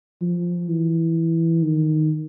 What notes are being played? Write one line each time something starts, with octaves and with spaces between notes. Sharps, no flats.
F3
E3
D#3